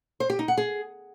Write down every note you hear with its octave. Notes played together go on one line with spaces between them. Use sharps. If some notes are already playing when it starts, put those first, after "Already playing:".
C5
G4
D#4
F#5
G#4